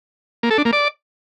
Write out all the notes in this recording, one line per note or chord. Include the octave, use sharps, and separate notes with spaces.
A#3
A4
D4
A#3
D5